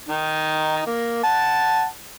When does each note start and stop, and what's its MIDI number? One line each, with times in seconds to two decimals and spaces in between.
0.08 0.83 51
0.08 0.83 63
0.86 1.22 58
1.23 1.85 78
1.23 1.85 81